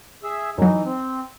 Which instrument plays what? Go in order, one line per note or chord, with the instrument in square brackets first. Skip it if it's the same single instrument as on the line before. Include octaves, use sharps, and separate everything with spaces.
[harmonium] G#4 E5
[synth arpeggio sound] F#2 F#3 [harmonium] E3 D#4
[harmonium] C4